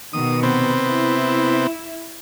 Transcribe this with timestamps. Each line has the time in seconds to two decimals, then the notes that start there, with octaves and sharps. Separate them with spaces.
0.13 B2 D#3 D#6
0.43 C3 B3 C4
0.86 E4